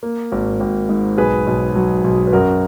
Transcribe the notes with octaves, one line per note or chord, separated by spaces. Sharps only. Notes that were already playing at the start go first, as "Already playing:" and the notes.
A#3
G#1
G#1
G#2
B1 G#4 B4
B1
F#3
B1
B4
F#2 F#4 A#4